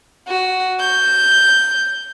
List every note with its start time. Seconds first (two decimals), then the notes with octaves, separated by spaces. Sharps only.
0.28 F#4
0.80 G6